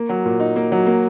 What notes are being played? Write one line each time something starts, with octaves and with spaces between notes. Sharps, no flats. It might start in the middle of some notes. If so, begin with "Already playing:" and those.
Already playing: A#3
F#3
A#2
D#4
A#3
F#3
A#3